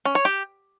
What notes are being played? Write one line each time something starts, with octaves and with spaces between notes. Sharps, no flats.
C#4
C#5
G4